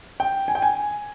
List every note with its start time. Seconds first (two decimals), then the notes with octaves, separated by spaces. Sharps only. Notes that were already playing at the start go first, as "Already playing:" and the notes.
0.20 G5
0.48 G#5
0.55 G5
0.62 G#5